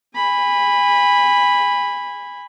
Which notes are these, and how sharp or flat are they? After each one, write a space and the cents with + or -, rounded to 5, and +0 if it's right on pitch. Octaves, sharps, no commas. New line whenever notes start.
G#5 -25 B5 +0